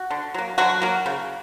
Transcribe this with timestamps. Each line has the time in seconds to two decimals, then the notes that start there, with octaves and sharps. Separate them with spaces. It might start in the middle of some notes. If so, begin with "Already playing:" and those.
Already playing: F#4
0.11 D3
0.34 F#3 A#3
0.58 D3 F#3 F#4
0.82 F#3 A#3
1.06 C#3